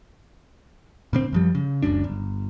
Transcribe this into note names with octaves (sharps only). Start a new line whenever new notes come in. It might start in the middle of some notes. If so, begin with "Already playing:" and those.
A#2 D3 C4
F#2 F3 G3
C#3
F#1 C#2 F#2 D4
G1